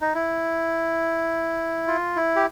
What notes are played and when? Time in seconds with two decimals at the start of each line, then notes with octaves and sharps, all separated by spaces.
0.01 D#4
0.15 E4
1.88 F4
2.16 E4
2.36 G4